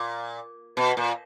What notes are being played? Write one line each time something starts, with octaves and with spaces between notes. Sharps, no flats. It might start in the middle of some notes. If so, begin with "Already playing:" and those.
Already playing: A#2
B2
A#2